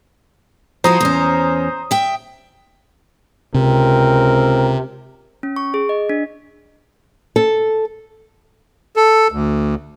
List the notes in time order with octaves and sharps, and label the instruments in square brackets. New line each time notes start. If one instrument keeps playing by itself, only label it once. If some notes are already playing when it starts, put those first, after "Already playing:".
[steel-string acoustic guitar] F3 E4 F#4 [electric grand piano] C5 A#5 D#6
[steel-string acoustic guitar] E2 C#4
E5 G5
[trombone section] C#2 C4 A#4 [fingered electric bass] C3
[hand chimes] C#4
C#6
G#4
D#5
D4
[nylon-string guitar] A4
[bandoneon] A4
D2